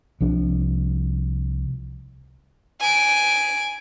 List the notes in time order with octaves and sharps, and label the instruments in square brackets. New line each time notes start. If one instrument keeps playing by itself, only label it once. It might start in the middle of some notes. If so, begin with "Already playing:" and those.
[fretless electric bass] C2 F3 D4
[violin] G#5 D7